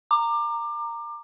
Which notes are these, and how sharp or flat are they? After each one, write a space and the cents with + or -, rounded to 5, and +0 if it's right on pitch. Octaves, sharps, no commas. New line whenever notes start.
A#5 -10 D6 +25